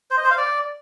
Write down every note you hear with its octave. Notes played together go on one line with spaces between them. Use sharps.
C5
D#5
C5
F5
D5